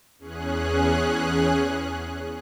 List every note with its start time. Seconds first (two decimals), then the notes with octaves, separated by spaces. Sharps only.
0.19 E2 C#4 G#4 F#6